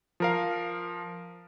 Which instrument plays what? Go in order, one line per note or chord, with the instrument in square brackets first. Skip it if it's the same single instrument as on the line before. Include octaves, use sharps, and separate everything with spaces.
[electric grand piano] F3 A#4 F5